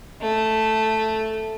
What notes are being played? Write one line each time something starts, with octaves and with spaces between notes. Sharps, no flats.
A3